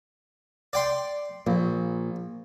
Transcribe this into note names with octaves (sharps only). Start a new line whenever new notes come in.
D5 G5 C6
A#1 A#2